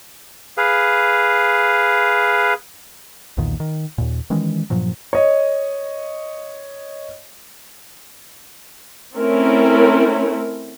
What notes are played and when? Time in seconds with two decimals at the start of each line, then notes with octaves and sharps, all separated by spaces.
0.57 G#4 B4 F5
3.37 B1 E2 A#2 D#3
3.60 D#3
3.98 D#2 A#2
4.30 D#3 E3 G#3 C#4
4.70 G2 A#2 F3 F#3
5.13 C#5 D#5
9.16 A3 C4 C#4 E4 A#4